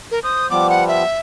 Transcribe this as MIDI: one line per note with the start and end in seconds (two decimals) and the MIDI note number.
0.11 0.20 70
0.23 0.48 72
0.23 0.47 87
0.50 1.04 53
0.50 1.04 55
0.50 1.04 59
0.50 0.68 86
0.70 0.84 78
0.88 1.20 76